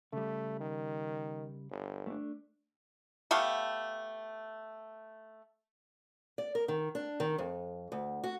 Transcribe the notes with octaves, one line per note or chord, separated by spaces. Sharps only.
C#3 G3 A3
D#3
G1
A3 D4
A3 B3 G4 F5
D5
A#4
D#3
D4
D#3
F2
D2
F#4